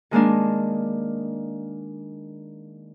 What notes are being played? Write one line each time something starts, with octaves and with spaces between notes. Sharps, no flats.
D#3 G#3 A#3 D4